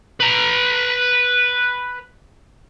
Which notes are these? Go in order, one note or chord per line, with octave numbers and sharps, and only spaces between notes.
B4 A#5